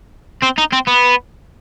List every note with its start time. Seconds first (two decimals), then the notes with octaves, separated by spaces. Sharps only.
0.43 C4
0.58 D#4
0.73 C4
0.88 B3